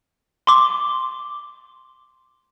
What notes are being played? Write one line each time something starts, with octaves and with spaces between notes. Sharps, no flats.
C6 D6